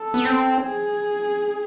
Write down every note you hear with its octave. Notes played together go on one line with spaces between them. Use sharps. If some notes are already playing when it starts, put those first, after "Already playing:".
Already playing: A4
B3
C4
G#4